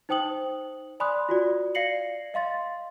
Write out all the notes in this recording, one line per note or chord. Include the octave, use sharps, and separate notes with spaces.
D#4 C5 G5 D#6 F#7
D5 G#5 B5 C6 D#6 F#6
F4 F#4 D5
D5 F5 A#6 C7 C#7 F#7
D#5 F5 C6 A6